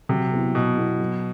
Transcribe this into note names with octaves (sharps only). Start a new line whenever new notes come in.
C3 F#3
B3 E4
B2 F#3
B3 E4
F#3